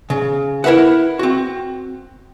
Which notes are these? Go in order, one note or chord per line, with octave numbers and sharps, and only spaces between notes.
C#3
E4 A#4 B4 E5 F#5
C4 F#4